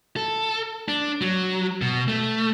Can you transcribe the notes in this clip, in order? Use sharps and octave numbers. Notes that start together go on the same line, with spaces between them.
A4
D4
F#3
B2
A3